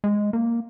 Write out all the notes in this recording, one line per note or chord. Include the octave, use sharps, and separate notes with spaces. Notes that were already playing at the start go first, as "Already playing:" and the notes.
G#3
A#3